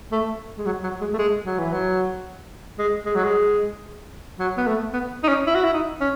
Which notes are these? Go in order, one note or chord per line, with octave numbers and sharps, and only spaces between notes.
A3
G#3
F#3
F#3
G#3
A3
G#3
F#3
E3
F#3
G#3
G#3
F#3
G#3
F#3
B3
A3
B3
D#4
C#4
E4
F#4
E4
D#4
C#4